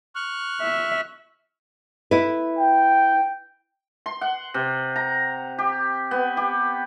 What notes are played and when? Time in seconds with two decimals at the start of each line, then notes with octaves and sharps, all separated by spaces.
0.15 C#6 F6 F#6
0.62 E5
2.11 E4 B4
2.59 G5
4.06 C6
4.21 F#5
4.54 C3
4.96 A#5
5.58 G4
6.11 B3
6.37 G4